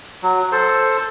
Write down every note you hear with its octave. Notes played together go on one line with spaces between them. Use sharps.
F#3
A4 C5